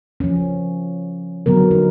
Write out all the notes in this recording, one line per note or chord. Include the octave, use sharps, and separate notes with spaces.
F3 C#4
D3 F#3 B3 A#4
D#4